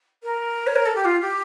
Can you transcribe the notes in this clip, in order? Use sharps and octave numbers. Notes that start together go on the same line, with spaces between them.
A#4
C#5
A#4
A4
G4
F4
G4